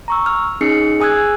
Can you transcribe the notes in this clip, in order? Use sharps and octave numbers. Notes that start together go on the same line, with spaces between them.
A#5 C#6 E6
F6
C#4 D#4 G#4 C7 C#7
G#4 G#5 D#6 E6 F#6 G#6